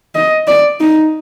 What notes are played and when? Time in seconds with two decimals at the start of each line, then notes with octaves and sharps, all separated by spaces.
0.15 D#5
0.48 D5
0.80 D#4